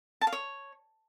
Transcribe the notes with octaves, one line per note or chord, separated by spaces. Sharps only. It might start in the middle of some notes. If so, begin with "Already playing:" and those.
A5
F5
C#5